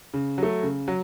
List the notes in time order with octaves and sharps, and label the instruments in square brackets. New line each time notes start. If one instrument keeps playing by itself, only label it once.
[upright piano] C#3
F#3 A3
C#3
F#3